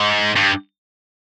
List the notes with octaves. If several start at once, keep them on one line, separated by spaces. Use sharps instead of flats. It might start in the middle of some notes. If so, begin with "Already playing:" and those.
Already playing: G#2
G2